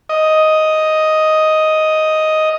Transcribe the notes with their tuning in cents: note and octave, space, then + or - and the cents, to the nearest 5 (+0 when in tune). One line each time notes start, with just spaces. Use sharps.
D#5 +5